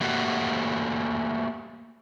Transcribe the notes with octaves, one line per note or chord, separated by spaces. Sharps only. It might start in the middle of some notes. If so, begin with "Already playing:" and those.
A3 A#3 F#4 G4